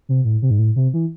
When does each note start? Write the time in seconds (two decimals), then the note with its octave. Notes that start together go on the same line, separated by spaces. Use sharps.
0.09 C3
0.25 A2
0.42 C3
0.51 G#2
0.59 A2
0.76 C3
0.94 E3